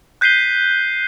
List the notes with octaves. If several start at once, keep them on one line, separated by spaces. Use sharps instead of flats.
F#6 G6 B6 C7 D#7 G7